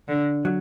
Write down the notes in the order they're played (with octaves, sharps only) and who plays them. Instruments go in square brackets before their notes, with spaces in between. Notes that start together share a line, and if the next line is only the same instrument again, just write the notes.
[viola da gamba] D3
[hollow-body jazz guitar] F#3